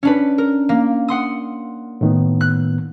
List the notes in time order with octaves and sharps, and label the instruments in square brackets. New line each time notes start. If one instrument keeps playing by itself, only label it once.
[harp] C#4 D4 B4
A#4
A#3
F#5 C6 D#6
[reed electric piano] A2 D#3 B3
[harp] F#6